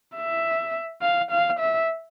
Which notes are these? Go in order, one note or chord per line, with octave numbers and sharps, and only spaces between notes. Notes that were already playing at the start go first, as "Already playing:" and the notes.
E5
F5
F5
E5